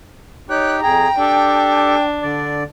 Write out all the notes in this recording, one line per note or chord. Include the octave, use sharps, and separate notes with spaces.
D#4 G4 C#5 G5 F#6
F2 G#4 G5 A#5
D4 G4 A4
D3 D5